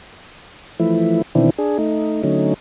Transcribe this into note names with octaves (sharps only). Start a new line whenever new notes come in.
E3 F3 A3 E4
B2 D#3 E3 C4 D4 E4
D4 G#4
A3 D#4
D3 F#3 A3 C#4 D#4